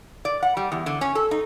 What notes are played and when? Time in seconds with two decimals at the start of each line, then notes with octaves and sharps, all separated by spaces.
0.25 D5
0.43 F#5
0.57 G3
0.72 E2
0.86 D3
1.01 C#4
1.15 A4
1.31 D#4